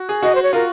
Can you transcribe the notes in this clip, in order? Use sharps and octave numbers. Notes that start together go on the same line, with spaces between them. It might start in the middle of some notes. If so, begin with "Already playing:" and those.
Already playing: F#4
G#4
F#4 D#5
C5
C#5
F4 A#4